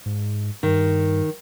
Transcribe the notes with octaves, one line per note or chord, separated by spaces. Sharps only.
G#2
G2 D#3